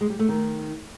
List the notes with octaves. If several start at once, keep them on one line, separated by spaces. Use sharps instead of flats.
G#3
G3
A3
D#3